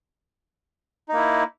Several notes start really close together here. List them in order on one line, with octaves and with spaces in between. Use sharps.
D#4 A#3 E4